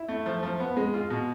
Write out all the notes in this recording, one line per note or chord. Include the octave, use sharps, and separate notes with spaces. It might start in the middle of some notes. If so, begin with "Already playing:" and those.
Already playing: E4
A3
F3
F3
B3
G#3
F4
B2